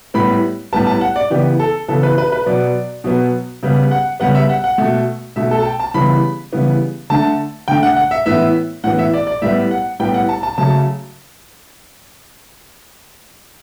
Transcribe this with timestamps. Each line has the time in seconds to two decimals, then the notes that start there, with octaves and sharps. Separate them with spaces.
0.14 A2 G3 B3 B5
0.73 A2 G3 B3 A5
0.87 A5
1.01 F#5
1.16 D5
1.30 C#3 E3 B3 G4
1.59 A4
1.88 C#3 E3 B3 A4
2.03 B4
2.18 B4
2.32 B4
2.46 B2 F#3 B3 D5
3.04 B2 F#3 B3
3.63 C#3 G3 B3
3.91 F#5
4.20 C#3 G3 B3 F#5
4.35 E5
4.49 F#5
4.64 F#5
4.78 B2 A3
5.36 B2 A3 E5
5.51 A4
5.59 A5
5.65 G5
5.80 A5
5.94 C#3 E3 G3 B3 B5
6.53 C#3 E3 G3 B3
7.10 D3 A3 A5
7.68 D3 A3 G5
7.83 F#5
7.96 F#5
8.11 E5
8.26 A2 E3 B3 E5
8.84 A2 E3 B3 F#5
8.99 E5
9.14 D5
9.27 D5
9.42 A2 G3 B3 E5
9.71 F#5
10.00 A2 G3 B3 G5
10.14 F#5
10.29 A5
10.43 A5
10.58 C#3 F#3 A3 A5